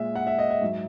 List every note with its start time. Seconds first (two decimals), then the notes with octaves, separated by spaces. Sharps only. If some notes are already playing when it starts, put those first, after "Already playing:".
Already playing: A#2 G#3 E5
0.16 F#5
0.27 E5
0.39 D#5
0.50 E5
0.62 G#2 F#3